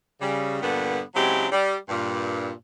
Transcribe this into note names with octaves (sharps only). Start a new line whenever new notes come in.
C#3 G3
G2 A#2 D3 B3
C#3 F#3 G#3 C4 E4 G4
G3
G2 A#2